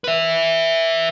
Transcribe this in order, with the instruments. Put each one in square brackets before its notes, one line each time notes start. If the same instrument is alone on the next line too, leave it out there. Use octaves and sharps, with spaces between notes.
[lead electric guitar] B4 E5